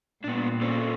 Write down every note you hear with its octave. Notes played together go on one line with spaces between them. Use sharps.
A#2 B3 D4
C#4 A4 C5